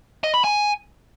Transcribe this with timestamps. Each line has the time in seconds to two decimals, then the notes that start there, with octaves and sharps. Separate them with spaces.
0.24 D#5
0.34 B5
0.44 G#5